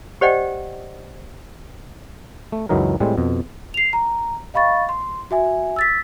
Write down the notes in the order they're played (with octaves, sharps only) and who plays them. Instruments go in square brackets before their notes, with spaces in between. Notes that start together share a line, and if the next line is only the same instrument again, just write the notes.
[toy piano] G4 C5 D5 D#5 F#5 G5
[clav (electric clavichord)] A3
C#2 F#2 E3 F#3 D#4 A#4
A2 G3 G#3 C4
F2 B2
[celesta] C7 F7
A#5
D#5 F5 B5 C#6 A6
C6
F#4 E5 G#5
E6 A6 B6